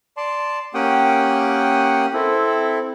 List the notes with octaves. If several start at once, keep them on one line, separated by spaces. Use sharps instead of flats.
D5 A5 C6
A#3 C#4 G4 F#5 G5 D#6
C4 E4 A4